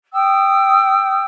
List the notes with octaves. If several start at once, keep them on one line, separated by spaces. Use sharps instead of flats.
G5 D#6 E6